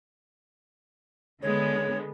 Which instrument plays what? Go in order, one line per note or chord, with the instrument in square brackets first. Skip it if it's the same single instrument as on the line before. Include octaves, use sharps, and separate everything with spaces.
[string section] D3 G#3 B3 [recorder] C#5